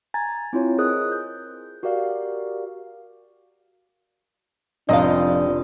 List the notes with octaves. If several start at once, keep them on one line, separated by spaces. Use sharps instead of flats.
G#5 A#5 G#6 A6
C4 E4 F4 C#5
G#4 A#4 C5 D#5 D#6 F#6
G6
F#4 G4 A#4 D5 F5
F1 C3 F3 D4 D#5 F5 D#6